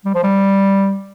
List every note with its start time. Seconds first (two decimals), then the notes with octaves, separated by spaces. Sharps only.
0.05 G3
0.15 F3
0.23 G3